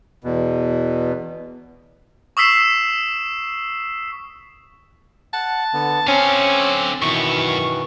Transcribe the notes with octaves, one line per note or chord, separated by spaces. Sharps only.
E2 B2
C#6 D#6 E6 B6 C7 E7
F#5 A5
D3 B3
D3 C4 C#4 F5
F#2 B2 D#3 E3 C#6